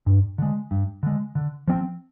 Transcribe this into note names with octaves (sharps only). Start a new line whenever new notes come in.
G2
D3 G#3
G2
D3 G#3
D3
F3 C4